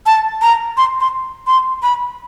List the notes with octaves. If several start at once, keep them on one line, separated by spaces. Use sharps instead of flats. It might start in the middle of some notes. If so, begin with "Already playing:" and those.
A5
A#5
C6
C6
C6
B5